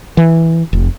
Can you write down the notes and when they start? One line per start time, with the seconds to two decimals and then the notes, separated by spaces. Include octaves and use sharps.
0.17 E3
0.73 F1